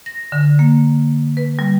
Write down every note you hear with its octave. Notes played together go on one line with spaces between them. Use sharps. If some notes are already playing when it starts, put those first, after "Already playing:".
A#6
D3
A#3
B4
G3